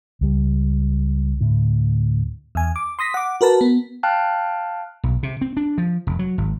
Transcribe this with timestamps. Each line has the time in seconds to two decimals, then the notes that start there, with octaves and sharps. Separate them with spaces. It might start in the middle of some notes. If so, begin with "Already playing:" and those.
0.21 C#2 G3
1.41 D2 A2
2.55 E2 G#5
2.76 D6
2.99 C6 D#6 A#6 B6
3.14 F#5 D6
3.41 F#4 A#4 B4 A5
3.61 B3
4.03 F5 G5 A5 F6 F#6
5.03 B1
5.23 C3
5.41 C4
5.57 D4
5.78 F3
6.07 F1
6.19 F#3
6.38 G#1